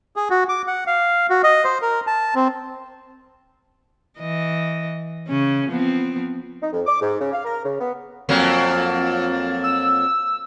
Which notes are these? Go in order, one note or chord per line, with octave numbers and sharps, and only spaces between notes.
G#4
F#4
D6
F#5
F5
F#4
D#5
C5
A#4
A5
C4
E3 D#5
C#3 C#4
F3 B3 C4
D#4
F2
D6
G#2
C#3
F5
A#4
C#3
B3
F2 F#3 A#3
E6